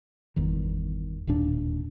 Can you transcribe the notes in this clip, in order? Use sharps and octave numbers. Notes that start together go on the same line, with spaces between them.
G1 E2 D#3
E1 D#2 A#2 D4